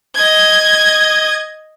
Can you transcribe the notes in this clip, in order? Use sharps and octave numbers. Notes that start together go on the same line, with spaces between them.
D#5 G#6